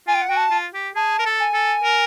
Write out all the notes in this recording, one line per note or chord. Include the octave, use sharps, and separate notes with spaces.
F4 G#5
G5
F#5
F#4 G5
A5
F4
G4
G#4 A5
A#4
A4
G#5
A4
A#4